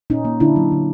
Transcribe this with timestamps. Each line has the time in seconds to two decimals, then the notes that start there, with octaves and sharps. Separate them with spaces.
0.10 A#2 C#4 D#4
0.25 A#3
0.40 D3 D4 E4
0.56 F#3
0.71 D3